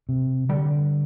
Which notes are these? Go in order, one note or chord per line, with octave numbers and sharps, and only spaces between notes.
C3
D3 G3